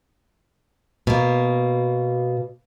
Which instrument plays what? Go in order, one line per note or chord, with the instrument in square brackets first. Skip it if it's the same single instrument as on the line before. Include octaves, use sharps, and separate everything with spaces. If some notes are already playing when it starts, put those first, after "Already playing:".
[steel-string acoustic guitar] B2 A#3